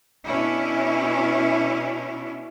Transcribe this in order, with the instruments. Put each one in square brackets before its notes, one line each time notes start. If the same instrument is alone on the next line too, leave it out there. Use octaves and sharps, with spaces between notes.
[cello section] B2 C#4 D4 E4